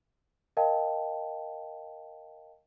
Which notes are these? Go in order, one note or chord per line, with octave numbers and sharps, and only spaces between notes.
A#4 D#5 F5 G5 A5